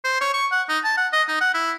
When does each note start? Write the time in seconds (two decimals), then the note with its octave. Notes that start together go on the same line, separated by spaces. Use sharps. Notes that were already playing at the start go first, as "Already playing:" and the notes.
0.04 C5
0.21 C#5
0.34 C#6
0.52 F#5
0.69 D#4
0.84 A5
0.97 F#5
1.13 D#5
1.28 D#4
1.41 F#5
1.54 E4